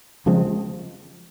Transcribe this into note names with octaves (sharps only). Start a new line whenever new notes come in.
C#3 F3 G#3 C4